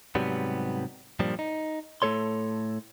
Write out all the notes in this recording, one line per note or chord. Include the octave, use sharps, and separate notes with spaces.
G#2 C3 F#3 G3 B3
G2 A#2 F3 G3
D#4
A2 A3 A4 C#5 C6